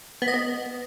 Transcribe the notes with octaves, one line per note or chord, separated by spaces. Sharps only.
B3
D#5
B3